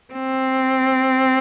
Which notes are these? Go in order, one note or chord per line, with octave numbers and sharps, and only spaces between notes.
C4